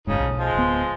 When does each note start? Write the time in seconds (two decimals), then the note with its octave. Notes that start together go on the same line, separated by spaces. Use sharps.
0.07 F#1 G#2 C#3 F3 D#4
0.19 B1
0.38 F3 G#3
0.55 D1 B3